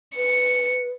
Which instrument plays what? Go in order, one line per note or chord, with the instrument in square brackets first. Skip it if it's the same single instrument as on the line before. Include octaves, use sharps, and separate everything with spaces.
[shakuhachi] B4 [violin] C#7